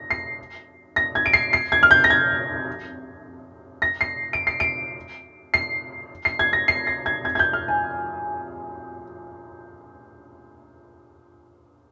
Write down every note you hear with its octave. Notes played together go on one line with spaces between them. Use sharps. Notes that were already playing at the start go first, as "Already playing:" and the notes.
Already playing: A#6
C7
A#6
G#6
D7
C7
C7
G#6
F6
G6
A#6
G#6
A#6
C7
D7
C7
D7
C7
C7
G#6
A#6
C7
A#6
G#6
G#6
G#6
G6
F6
G#5